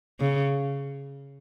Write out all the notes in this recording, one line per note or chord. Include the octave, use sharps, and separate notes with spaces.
C#3